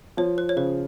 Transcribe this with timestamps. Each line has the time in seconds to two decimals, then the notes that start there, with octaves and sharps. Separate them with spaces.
0.17 F3 C#5
0.38 C5
0.49 C#5
0.56 C#3 C5